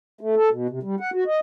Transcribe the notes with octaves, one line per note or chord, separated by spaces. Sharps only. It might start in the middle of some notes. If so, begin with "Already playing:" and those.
A3
A4
B2
C3
G3
F#5
F#4
D#5